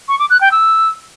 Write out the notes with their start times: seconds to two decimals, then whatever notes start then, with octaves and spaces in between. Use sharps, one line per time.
0.08 C#6
0.19 D6
0.30 F#6
0.41 G5
0.52 E6